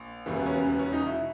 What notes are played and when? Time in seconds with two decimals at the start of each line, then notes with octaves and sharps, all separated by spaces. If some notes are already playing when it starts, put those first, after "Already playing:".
Already playing: A#1
0.26 E1 D#2 C#3 E3
0.36 B3
0.46 C#4
0.55 B3
0.66 B3
0.79 C#4
0.93 D#4
1.06 B2 E4